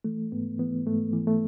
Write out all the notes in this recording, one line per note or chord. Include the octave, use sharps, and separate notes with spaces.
E3 A3
G#2 B3
E3 B3
G#2 A3
E3
A3